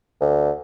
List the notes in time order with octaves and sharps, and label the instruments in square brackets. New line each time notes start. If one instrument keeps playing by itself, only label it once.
[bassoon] D2